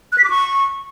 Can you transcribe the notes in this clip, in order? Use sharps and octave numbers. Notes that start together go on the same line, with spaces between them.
F#6
B6
D6
C#6